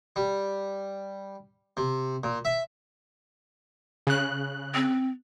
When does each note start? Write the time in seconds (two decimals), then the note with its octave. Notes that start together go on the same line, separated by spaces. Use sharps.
0.16 G3
1.77 C3
2.24 A#2
2.45 E5
4.07 C#3 F#6
4.74 C4